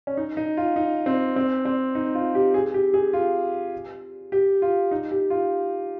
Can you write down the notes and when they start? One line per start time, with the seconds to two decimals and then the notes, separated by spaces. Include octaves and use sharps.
0.07 C#4
0.17 D#4
0.37 D#4
0.57 F4
0.76 D#4
1.06 C4
1.36 C4
1.65 C4
1.95 D#4
2.15 F4
2.35 G4
2.54 G#4
2.74 G4
2.94 G#4
3.13 F4
4.32 G4
4.62 F4
4.91 D#4
5.11 G4
5.30 F4